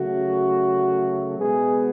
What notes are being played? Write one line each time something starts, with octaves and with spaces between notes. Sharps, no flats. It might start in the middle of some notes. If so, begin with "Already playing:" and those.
Already playing: C#3 F#3 A3 F#4
B2 G#3 B3 G#4